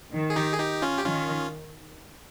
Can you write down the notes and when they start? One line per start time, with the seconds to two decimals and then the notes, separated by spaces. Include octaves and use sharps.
0.12 D#3
0.30 G#4
0.36 D#4 G4
0.53 G#4
0.59 D#4 G4
0.82 C#4 F4
0.98 G4
1.05 D#3 C#4 F4